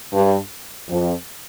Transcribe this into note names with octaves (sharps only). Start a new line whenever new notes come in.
G2
F2